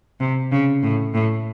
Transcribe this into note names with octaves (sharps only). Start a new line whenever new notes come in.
C3
C#3
A2
A2